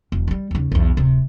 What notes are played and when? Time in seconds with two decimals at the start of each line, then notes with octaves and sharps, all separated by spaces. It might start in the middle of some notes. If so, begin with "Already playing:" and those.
0.12 E1 D2
0.28 F#3 G3
0.51 D#2 C#3
0.72 B1 E2
0.97 D1 C3